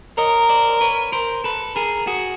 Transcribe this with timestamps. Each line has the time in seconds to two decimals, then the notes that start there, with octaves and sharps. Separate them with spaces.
0.18 A#4 C#5 D#5
0.49 C5 D5
0.81 B4 C#5
1.12 A#4 C5
1.44 A4 B4
1.76 G#4 A#4
2.07 F#4 G#4